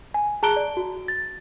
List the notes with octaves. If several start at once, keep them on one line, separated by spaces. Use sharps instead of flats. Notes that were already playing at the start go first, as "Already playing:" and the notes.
G#5
G#4 A5 A#5 F#6 D7 G7
D5
F#4
A6